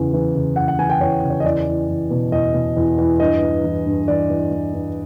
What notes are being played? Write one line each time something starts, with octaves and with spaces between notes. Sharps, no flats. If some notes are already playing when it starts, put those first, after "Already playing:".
Already playing: E2 C#3
E3
C#3
E2 F#5
F#5
E3 G#5
G5
E2 C#5
C#3
C#5
D#5
E2 D5
E2
E2
B2
E2 D#5
B2
E2
E2
G2 D#5
E3
E3
G2
E3 D5
E3
E3
G2